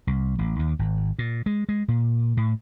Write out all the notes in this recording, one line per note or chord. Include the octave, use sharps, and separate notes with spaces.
C2
A1
D#2
G#1
A#2
G#3
G#3
A#2
A2